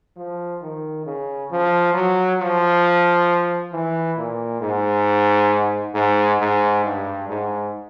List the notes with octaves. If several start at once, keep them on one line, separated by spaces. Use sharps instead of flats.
F3
D#3
C#3
F3
F#3
F3
E3
A#2
G#2
G#2
G#2
G2
G#2